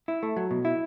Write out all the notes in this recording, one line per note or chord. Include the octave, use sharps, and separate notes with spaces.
E4
A3
F#3
B2
E4